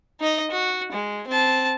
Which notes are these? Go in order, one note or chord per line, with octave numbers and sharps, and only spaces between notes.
D#4 D#5
F#4
G#3
C4 A5